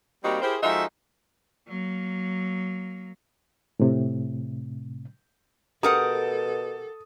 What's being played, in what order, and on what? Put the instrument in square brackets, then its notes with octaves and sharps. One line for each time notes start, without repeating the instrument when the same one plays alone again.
[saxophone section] G3 A#3 C4 D#4 F#4 G4
E4 G4 G#4 A#4 C5
F3 G#3 D#4 F#4 A4 E5
[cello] F#3 A#3
[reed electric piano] A2 C3
[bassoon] B2 [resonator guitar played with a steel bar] G4 A#4 F#5 [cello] A4 [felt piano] D#6